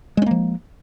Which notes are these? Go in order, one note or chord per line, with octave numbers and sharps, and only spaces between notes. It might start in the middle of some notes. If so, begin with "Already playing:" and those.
F3 G#3 A#3 C#4